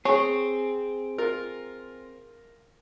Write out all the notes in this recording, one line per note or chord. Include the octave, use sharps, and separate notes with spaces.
C4 G#4 C#5
F4 A#4